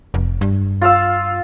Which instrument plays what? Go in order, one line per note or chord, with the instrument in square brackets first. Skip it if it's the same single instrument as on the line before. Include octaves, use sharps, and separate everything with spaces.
[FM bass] F1
G2
[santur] F4 F5 E6